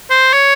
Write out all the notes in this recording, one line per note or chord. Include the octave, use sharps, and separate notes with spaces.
C5
C#5